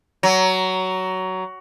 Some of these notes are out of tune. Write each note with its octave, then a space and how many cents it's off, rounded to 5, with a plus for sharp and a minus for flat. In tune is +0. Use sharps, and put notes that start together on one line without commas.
F#3 +15